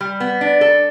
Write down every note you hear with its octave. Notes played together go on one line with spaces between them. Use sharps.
G3
B3
D4
A4